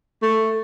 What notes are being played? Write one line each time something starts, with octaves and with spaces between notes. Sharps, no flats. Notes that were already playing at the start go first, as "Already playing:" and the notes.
A3